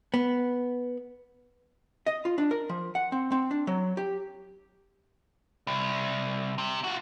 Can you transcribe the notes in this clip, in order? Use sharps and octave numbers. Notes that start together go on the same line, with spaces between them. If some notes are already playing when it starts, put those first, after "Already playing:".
B3
D#5
F4
D4
A#4
F3
F#5
C4
C4
D4
F#3
G4
C2
C3
F4 F#4